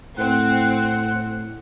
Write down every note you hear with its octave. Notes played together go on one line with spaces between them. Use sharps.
A2 C4 F#5